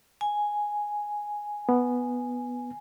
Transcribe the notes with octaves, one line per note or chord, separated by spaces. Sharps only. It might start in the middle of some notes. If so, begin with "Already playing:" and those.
G#5
B3